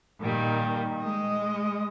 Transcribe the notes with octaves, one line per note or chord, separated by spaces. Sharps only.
A#2 D#3 G3
G#3 D#5